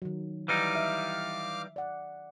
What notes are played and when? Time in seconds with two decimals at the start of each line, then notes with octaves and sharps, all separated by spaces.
0.02 D#3 F#3
0.48 E3 G3 D#4 F5 D6 F6
0.75 E5
1.76 D5 F#5